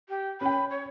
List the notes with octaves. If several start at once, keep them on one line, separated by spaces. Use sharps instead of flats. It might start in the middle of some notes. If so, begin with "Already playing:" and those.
G4
C#4 G5 B5
C#5